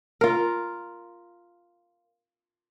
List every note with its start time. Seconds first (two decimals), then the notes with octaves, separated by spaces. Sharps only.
0.21 F4 A#4